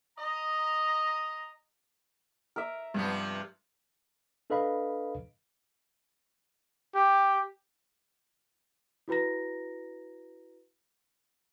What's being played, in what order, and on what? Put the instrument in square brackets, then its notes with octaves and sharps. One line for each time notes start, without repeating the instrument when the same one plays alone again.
[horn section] D#5 A#5
[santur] A#4 E5
[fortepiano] G2 [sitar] C3 F3 B3
[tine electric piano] D4 A4 B4 D#5 F5 B5
[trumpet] G4
[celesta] E4 F#4 B4 A#5 A#6